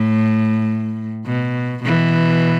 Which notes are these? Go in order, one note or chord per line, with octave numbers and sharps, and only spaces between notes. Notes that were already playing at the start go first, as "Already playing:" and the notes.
Already playing: A2
B2
B2 E3